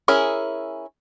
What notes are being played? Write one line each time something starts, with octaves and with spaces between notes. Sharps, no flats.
C#4 E4 G#4 A#4